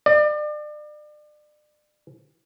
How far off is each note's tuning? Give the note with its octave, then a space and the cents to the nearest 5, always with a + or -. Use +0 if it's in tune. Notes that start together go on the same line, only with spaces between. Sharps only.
D5 +35